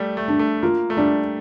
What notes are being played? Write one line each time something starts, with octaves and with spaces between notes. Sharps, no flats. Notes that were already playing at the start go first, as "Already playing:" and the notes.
Already playing: G3 A3
A3
D4
A3
A#3 F4
A3
G3 D4